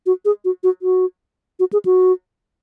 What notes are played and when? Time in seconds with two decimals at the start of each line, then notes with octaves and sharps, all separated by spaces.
0.06 F#4
0.25 G#4
0.45 F#4
0.63 F#4
0.82 F#4
1.60 F#4
1.73 G#4
1.85 F#4